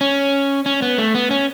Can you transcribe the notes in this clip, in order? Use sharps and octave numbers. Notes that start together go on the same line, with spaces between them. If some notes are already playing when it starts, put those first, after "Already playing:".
C#4
C#4
B3
A3
B3
C#4